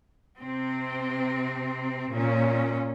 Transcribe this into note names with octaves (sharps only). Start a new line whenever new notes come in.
C3 C4
A#2 C#4